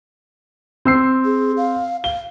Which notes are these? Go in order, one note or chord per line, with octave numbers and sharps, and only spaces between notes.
C4 E6 C7
G#4
F5
F5 G7